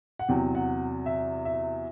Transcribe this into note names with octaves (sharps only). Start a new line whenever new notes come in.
F#5
E2 C3 F#3 G5
F#5
E5
E5